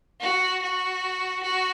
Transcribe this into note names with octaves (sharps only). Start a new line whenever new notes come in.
F#4
F#4
F#4